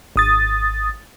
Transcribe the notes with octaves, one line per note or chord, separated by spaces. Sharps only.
G#1 D#6 A6